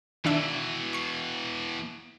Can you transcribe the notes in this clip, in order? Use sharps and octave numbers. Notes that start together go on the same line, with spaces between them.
B2 D#3 E3 D4 E5
C#6 C7